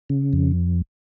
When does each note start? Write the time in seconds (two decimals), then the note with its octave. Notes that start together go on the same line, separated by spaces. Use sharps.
0.10 C#3
0.33 F2